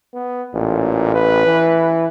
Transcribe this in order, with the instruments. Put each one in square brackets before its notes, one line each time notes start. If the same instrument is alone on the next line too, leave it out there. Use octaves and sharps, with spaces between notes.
[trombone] B3
[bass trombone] A1 [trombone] A#2
[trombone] B4
[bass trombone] E3